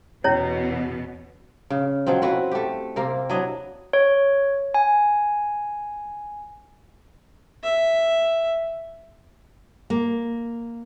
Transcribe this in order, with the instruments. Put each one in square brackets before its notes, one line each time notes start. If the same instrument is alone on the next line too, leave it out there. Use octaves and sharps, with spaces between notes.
[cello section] E2 B2 B3 [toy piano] C#4 E4 C#5
[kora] C#3
B2 F3 F#3 C4
C4 E4 F#4 B4
A3 G4
C3 A#3 A#4
F#3 D4 E4 D#5
[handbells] C#5
G#5
[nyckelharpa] E5
[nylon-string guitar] A#3